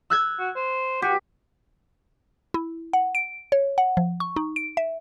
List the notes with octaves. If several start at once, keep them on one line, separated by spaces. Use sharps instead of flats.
E6 F#6 G#6
F#4
C5
F#4 G4
E4
F#5
D7
C#5
F#5
F3
C#6
D#4
D7
E5